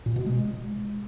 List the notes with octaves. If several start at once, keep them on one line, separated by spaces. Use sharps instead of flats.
A#2
B2
G#3